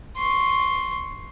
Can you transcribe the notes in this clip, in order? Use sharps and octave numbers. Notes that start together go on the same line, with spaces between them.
C6 C#6